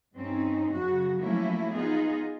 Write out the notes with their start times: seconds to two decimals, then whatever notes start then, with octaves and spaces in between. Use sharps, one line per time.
0.16 G2 C4 C#4 D#4
0.72 F#2 C#3 F#3 F#4
1.19 F3 F#3 A3 A#3 C#4 E4
1.74 B3 D#4 F4 G#4